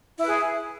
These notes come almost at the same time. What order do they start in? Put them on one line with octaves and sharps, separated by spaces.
E4 B4 G#4